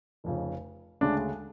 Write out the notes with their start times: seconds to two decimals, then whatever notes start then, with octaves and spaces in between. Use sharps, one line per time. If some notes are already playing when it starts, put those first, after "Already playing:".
0.24 F1 F2 C#3
1.01 D2 C#3 G#3 D4